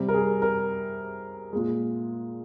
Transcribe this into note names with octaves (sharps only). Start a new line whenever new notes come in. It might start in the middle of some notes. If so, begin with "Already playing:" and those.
Already playing: C3 G3
A#4
G#4
A#4
A#2 G#3